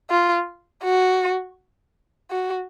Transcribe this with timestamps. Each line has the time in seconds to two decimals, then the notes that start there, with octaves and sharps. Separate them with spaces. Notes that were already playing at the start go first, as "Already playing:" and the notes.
0.10 F4
0.83 F#4
2.31 F#4